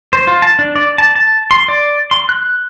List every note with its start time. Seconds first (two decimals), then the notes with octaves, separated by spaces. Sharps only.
0.13 C5
0.27 F4
0.42 A5
0.59 D4
0.76 D5
0.98 A5
1.15 A5
1.51 C6
1.68 D5
2.11 C6
2.29 F#6